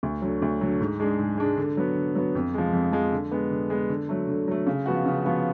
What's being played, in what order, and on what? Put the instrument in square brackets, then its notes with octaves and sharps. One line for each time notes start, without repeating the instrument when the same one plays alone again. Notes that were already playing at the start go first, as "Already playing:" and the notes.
[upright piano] D2
D3 F#3
D2
D3 F#3
G#2
G#3 D4 G#4
G#2
G#3 D4 G#4
D3
F#3 B3
D3
F#3 B3
F2
F3 G#3
F2
F3 G#3
D3
G#3 B3
D3
G#3 B3
D3
F#3 A3
D3
F#3 A3
C#3
F3 B3 F#4
C#3
F3 B3 F#4